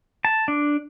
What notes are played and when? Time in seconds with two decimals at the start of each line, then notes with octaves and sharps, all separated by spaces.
0.25 A5
0.48 D4